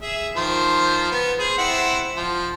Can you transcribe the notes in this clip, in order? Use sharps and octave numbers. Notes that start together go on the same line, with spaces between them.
G#4 E5
D#3 F3 C5
B3
G#4 C5
C4 E4 F#5
F3